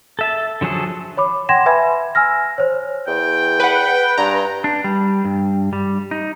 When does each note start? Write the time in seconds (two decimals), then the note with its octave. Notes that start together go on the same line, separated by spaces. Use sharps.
0.19 A4 E5 A5
0.61 D3 F3 F#3 G#4 A4
1.17 C#5 B5 D6
1.49 F#5 G5 C6 G#6 A#6 E7
1.66 B4 E5 G#5 B5 G#6
2.15 G#5 E6 F6 A#6
2.58 C5 C#5
3.07 E2 G5
3.60 B4 F#5
4.18 G2 A#5
4.64 D4
4.84 G3
5.25 G2
5.73 G3
6.11 D#4